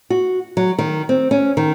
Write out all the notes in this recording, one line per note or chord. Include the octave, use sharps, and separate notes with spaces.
F#4
F#3
D#3
C4
C#4
D#3